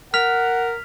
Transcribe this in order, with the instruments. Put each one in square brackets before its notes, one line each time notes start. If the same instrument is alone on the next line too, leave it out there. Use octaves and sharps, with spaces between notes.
[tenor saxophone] A#4 [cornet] F#5 [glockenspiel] F6 B6 F7